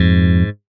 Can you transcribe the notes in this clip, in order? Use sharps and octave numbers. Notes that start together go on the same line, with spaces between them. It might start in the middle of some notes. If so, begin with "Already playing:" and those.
Already playing: F2 G#2